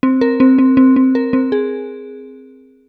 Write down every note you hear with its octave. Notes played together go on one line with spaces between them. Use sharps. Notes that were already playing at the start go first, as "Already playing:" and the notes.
C4
A#4
C4
C4
C4
C4
A#4
C4
G#4